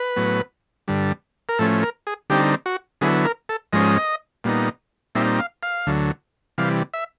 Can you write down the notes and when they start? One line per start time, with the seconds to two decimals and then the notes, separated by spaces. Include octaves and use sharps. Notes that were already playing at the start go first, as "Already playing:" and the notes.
Already playing: B4
0.16 A2 F#3 B3
0.88 G2 D3 G3
1.49 A#4
1.59 A2 F3 A3 C#4 A4
1.82 A#4
2.07 G#4
2.30 D3 G3 C4 D#4 G4
2.66 F#4
3.01 D3 F#3 B3 E4 G#4
3.25 A#4
3.49 A4
3.73 G#2 F3 G#3 C#4 D#5
4.44 A#2 G3 B3 D#4
5.15 A#2 G3 C4 D#4 E5
5.39 F5
5.63 F5
5.87 D2 D3 F#3
6.58 C3 E3 G3 F5
6.94 E5